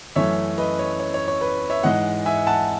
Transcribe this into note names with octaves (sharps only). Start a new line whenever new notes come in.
F#2 E3 A3 C#4 C#5 E5
B4 D#5
C#5
C#5
C#5
C#5
B4
C#5 E5
G#2 E3 G#3 D#5 F#5
E5 G#5
F#5 A5